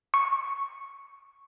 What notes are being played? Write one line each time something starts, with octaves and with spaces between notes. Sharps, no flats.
C#6